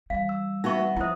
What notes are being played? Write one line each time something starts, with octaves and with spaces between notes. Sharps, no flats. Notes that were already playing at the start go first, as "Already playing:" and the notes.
E3 G3 F5
E6
B3 D#4 F#4 E5 F#5 C#6 A#6
B3
F3 E4 C5 E5 D#6